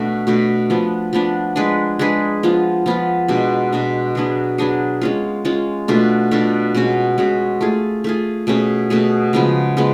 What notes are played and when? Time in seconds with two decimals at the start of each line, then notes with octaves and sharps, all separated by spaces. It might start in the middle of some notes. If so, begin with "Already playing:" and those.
Already playing: B2 A3 D4 F#4
0.27 B2 A3 D4 F#4
0.70 F3 B3 D4
1.13 F3 B3 D4
1.56 G#3 D4 G#4 B4
1.99 G#3 D4 G#4 B4
2.43 F3 B3 F4
2.86 F3 B3 F4
3.28 B2 G#3 D4
3.73 B2 G#3 D4
4.15 F#3 B3 D4 G#4
4.58 F#3 B3 D4 G#4
5.01 G#3 C#4 F4
5.45 G#3 C#4 F4
5.88 B2 A3 D4 F4
6.31 B2 A3 D4 F4
6.75 B2 G#3 C#4 F#4
7.18 B2 G#3 C#4 F#4
7.61 A3 F4 G#4
8.04 A3 F4 G#4
8.47 B2 A3 C#4 G#4
8.90 B2 A3 C#4 G#4
9.33 C#3 F3 G#3 B3
9.77 C#3 F3 G#3 B3